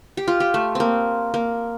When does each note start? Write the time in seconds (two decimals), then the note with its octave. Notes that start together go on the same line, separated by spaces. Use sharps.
0.17 G4
0.28 F4
0.40 G4
0.54 A3
0.75 A#3 C4
1.34 A#3